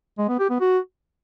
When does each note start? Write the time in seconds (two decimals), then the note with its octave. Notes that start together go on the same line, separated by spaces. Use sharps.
0.18 G#3
0.29 B3
0.39 G4
0.50 B3
0.61 F#4